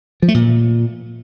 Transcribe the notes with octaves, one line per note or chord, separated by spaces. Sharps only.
F3
A3
A#2